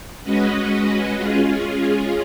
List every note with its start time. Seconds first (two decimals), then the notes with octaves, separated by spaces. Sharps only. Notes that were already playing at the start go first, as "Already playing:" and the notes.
0.23 G#3 C#4 F#4 B4 D#5
1.14 G#3 C#4 F4 G#4